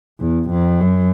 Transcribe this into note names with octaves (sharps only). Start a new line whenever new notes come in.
E2
F2
F#2